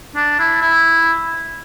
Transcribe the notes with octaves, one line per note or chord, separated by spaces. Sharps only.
D4
E4
E4